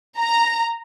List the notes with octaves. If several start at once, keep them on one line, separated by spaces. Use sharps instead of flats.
A#5